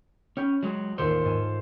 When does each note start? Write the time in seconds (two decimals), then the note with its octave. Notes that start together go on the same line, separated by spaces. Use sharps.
0.37 C#4 C#5 G5 B5
0.63 F#3 G#3
0.98 A1 D#2 F4 A4 C5
1.25 G#2 G#5 E7